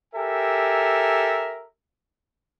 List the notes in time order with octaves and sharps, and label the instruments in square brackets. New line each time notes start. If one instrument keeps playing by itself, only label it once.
[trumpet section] G4 A4 A#4 E5 G#5